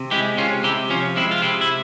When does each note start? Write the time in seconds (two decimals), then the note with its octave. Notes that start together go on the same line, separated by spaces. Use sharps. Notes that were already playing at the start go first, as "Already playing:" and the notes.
Already playing: C3
0.11 G#3 E4 G4
0.37 C3 C#4 F4
0.64 C3 E4 G4
0.90 F3 C#4 F4
1.16 G#3 C4 E4
1.31 F4
1.42 C3 C4 E4
1.61 E4